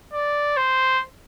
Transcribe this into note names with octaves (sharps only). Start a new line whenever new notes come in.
D5
C5